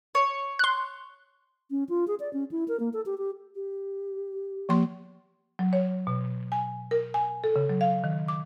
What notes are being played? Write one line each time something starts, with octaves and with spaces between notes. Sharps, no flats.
C#5
C6 F#6
C#4
F4
G#4
D5
C#4
E4
A#4
A#3
A4
G4
G4
G4
F3 A#3 C6
F#3
C#5
B2
G#5
A#4
G#5
A4
C#3
F#3
F5
D#3
D6